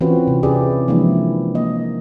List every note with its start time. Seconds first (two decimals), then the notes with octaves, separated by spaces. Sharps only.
0.01 E3 C4 C#4 F4 F#4 B4
0.27 C3
0.43 C#4 E4 G4 G#4 B4 D5
0.88 E3 F3 G#3 A#3 D4 E4
1.55 A#3 D#5